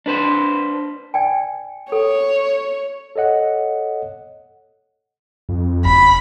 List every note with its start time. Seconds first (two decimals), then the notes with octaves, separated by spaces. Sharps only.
0.06 D4 B4 C5
1.14 D5 G5 G#5
1.92 A4 C#5
3.16 A4 C#5 D#5 F#5
5.49 F2
5.85 F#1 B5